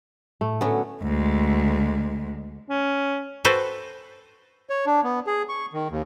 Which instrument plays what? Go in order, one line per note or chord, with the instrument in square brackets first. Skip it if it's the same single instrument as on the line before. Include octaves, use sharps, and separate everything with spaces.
[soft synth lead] A2 [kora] A3
[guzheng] D3 F#3 [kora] B3 C#4
[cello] D2 G#3
[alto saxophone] C#4
[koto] F#4 A4 B4 C5 G5
[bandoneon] C#5
D4
B3
G#4
C#6
D#3
D#2